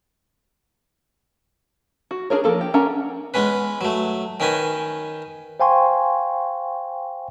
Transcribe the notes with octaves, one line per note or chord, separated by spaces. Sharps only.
F#4
D4 G#4 A#4 C#5
F3 A#3 A4 A#4
G4
C#4 D4 A#4 F#5 A#5
G#3 B3 C#4 B4
F#3 A3
D#3 C#4 D#4 B4 G#5
C5 F5 G5 G#5 C6 C#6